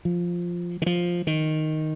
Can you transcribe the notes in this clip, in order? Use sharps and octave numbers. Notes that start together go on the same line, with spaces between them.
F3
D#3
F3
D#3